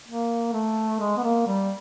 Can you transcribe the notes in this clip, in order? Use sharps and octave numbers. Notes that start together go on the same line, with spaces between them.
A#3
A3
G#3
B3
A#3
G3